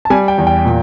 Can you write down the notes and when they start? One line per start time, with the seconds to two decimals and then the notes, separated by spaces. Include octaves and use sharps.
0.05 A5
0.10 G3 G#5
0.28 G5
0.38 E2
0.47 G5
0.65 A#2